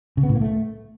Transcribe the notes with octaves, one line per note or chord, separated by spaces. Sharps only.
C#3
B3
A2
A#3
A3